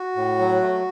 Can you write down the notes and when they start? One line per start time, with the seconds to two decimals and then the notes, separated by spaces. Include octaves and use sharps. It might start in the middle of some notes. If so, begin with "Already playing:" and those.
Already playing: F#4
0.16 A2
0.39 F#3
0.61 A3